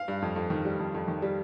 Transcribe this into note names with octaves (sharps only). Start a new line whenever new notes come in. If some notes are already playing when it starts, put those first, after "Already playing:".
Already playing: F5
G2
F2
F2
D#3
G3
F2
F2
D#3
G3